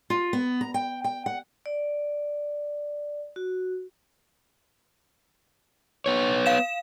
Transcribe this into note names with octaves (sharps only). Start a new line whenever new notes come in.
F4
B3
A#5
G5
G5
F#5
D5
F#4
B3 C#5
F5 E7